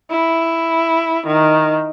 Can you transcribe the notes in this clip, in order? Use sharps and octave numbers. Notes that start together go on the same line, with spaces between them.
E4
D#3